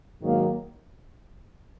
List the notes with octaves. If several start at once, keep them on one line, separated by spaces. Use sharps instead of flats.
G#2 D#3 F#3 A#3